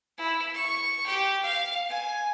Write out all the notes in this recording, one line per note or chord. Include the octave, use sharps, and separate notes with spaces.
E4
C#6
G4 G5
F5
G#5